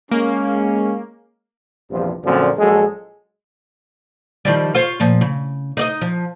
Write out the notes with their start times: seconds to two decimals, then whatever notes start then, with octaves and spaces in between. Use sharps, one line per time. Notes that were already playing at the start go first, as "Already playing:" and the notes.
0.11 G#3 A#3 C#4
1.91 A#1 E2 G2 C3 F3 F4
2.25 F#2 A#2 D3 F3 A#3 C4
2.58 A#1 F#3 G#3 G#4 A4
4.45 D#3 F3 G3
4.75 F4 C5 C#5
5.00 A#2 F3
5.21 C#3
5.77 D#4 D5 D#5
6.01 F3